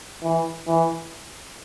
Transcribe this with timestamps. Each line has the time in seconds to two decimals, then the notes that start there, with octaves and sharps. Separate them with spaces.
0.23 E3
0.67 E3